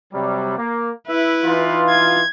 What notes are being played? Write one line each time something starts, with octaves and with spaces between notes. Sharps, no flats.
C3 F#3 G3
A#3
E4 B4 E5
E3 D#4 F4
G#6